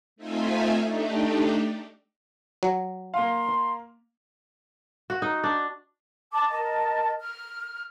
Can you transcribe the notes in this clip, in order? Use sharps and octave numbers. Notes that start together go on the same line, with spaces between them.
A3 C4 D#4 F4 E5 G#5
A3 D4 D#4 G4
F#3
A#3 F5 C6
F#4
D#4
D4
A5 D6
A#4 D#5 A5
F6